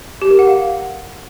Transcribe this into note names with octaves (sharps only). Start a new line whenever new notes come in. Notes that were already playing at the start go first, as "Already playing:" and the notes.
G4
A#4
F#5
F5